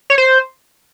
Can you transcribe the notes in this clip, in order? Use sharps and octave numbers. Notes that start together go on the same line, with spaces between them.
C#5
C5